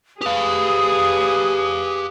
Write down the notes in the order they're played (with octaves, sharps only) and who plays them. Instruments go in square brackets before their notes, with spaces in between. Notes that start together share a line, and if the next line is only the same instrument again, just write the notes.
[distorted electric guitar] G4 F5 [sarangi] G#4 [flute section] B4 D#6